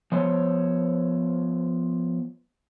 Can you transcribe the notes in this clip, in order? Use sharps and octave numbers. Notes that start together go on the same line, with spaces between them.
F3 B3 C5 C#5